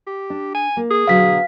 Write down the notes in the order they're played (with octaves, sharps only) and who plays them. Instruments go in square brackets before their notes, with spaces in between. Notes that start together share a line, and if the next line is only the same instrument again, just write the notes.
[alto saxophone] G4
[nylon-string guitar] D4
[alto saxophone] G#5
[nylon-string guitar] A#3
[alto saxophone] G#4
[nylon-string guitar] B2 D3 F#3 [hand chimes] F5 B6